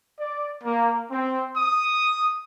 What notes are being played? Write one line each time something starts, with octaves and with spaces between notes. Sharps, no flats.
D5
A#3
C4
D#6